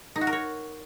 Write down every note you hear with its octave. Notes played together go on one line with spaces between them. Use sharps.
D#4
F#4
A#4
C#5